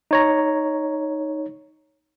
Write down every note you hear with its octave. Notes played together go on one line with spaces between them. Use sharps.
D#4 C#5 A#5